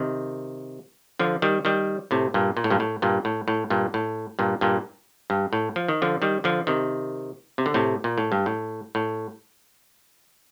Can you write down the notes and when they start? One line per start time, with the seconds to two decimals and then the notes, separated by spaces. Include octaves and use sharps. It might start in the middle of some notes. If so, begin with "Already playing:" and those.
Already playing: C3 D#3
1.19 D3 F3
1.42 D#3 G3
1.65 D#3 G3
2.11 A2 C3
2.34 G2 A#2
2.57 A#2
2.64 A2
2.70 G2 A#2
2.80 A2
3.02 G2 A#2
3.25 A2
3.48 A2
3.70 G2 A#2
3.94 A2
4.39 G2 A#2
4.61 G2 A#2
5.30 G2
5.53 A2
5.76 F3
5.88 D#3
6.02 D3 F3
6.22 D#3 G3
6.44 D3 F3
6.67 C3 D#3
7.58 C3
7.66 D3
7.74 A2 C3
8.04 A#2
8.18 A2
8.32 G2
8.46 A2
8.95 A2